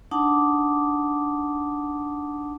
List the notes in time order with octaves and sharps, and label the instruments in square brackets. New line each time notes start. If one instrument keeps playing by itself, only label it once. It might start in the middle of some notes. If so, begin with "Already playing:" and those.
[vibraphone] D4 D#4 F#5 A5 D6 D#6